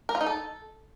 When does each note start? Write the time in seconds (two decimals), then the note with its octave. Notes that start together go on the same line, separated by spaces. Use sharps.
0.09 A#4
0.15 F4
0.21 D#4
0.26 A4